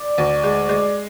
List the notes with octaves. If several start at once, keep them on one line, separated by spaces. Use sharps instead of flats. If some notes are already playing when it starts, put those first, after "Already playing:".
Already playing: D5
D2
G#3
G#3